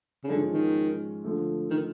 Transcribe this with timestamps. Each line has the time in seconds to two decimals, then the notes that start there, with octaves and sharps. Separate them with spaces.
0.24 C#3
0.30 G#2 D3 F3 G#3 C#4
0.54 D#3
1.24 D3 F3 A3
1.71 D#3